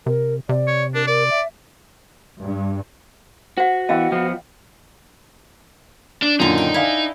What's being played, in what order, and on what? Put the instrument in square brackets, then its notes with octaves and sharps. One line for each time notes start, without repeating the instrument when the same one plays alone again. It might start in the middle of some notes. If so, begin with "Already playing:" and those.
[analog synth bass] C3 [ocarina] A#4
[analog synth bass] C3 [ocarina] D5
[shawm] C#5
[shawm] D4 [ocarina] A#4
[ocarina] A#4 [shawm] D5
[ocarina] E5
[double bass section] G2
[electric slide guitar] F#4 [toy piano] C5 F#5
[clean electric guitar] E3 B3 [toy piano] D#5 F5 G5
[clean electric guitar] F3 B3
[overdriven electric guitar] D4
[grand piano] F#2 A#2 F4 [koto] D3 D#3 [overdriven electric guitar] D#4
[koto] G5
[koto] E4 [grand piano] D5 F5 G#5